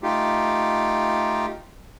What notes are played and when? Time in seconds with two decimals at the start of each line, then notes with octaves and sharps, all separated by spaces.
0.03 A3 D#4 F4 G4